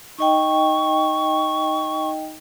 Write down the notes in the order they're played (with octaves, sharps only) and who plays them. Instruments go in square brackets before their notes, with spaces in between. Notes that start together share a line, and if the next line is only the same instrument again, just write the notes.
[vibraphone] D#4 D#5 G5 [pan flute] C#6